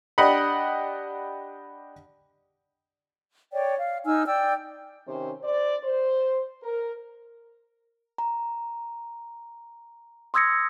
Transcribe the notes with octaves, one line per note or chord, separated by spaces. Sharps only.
D4 G4 D#5 F#5 B5
C#5 D5 G5
F5
D#4 G#5 E6 F6
D5 G5 E6
C3 D#3 C#4 G4 C5
C5 D5
C5
A#4
A#5
C6 D#6 E6 G#6 A#6 C#7